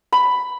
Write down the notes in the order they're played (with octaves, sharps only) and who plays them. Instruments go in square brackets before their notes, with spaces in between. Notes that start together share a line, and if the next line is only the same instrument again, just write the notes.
[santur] B5